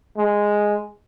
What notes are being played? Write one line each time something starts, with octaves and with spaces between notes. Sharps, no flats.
G#3